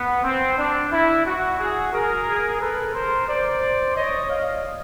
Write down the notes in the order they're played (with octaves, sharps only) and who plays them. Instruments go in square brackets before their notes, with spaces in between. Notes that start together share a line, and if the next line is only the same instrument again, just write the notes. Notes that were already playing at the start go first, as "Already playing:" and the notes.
Already playing: [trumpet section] B3
C4
D4
E4
F#4
F#4 G#4
G#4 A#4
A4 B4
A#4 C5
C5 D5
C#5 D#5
D#5 F5